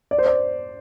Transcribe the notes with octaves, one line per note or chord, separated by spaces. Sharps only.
D5
C5
D5